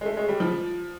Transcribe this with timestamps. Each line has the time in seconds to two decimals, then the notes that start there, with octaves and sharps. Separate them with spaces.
0.01 G#3
0.05 A3
0.17 G#3
0.28 G3
0.40 F3